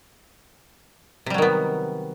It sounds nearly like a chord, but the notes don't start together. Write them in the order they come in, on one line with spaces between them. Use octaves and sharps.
C3 G3 F#3 D#3 B3